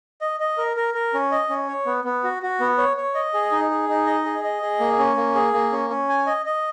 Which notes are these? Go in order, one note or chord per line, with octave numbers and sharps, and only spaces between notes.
D#5
D#5
A#4
A#4
A#4
C#4
D#5
C#4
C#5
B3
B3
F#4
F#4
B3
C#5
C#5
D#5
G#4
D#4
G#4
D#4
D#5
G#4
D#5
G#4
A#3
C#4
A#3
G#4
A#3
C#4
C#4
G#5
D#5
D#5